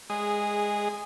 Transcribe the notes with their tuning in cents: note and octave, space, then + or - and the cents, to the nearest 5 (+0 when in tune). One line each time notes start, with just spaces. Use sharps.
G#3 +0 G#4 -15